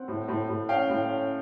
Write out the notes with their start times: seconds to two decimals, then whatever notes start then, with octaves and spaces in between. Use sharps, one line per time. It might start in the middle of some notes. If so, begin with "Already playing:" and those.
Already playing: C4 F#5
0.08 A2
0.28 A2
0.49 A2
0.69 C#4 F5 G5
0.89 A2
1.09 C#4